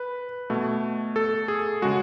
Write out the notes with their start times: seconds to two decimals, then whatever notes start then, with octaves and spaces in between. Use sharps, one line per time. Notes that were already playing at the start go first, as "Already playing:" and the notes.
Already playing: B4
0.50 B2 A3
1.16 A4
1.48 G#4
1.82 C#3 G#3 F#4